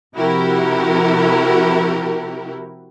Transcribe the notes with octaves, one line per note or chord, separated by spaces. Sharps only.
C3 F3 E4 F#4 G4 A#4